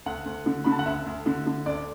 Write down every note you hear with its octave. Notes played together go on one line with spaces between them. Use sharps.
D2 F#5
D2
D3
D3 B5
A5
F#5
D2 E5
D2
D3
D3
D2 D5